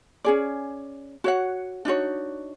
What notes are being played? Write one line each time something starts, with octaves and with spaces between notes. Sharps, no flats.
C#4 G#4 D5
F#4 C#5 F#5
D4 D#4 F#4 C#5